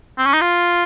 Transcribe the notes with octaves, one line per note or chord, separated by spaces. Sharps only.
C4
C#4
D#4
F4